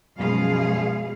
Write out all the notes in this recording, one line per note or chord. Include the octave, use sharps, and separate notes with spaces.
F#2 B2 F3 G#3 G#4 F5